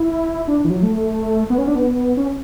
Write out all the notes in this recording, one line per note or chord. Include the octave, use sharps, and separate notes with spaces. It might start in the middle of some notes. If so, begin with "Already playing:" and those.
Already playing: E4
D4
E3
F#3
A3
B3
C#4
D4
B3
C#4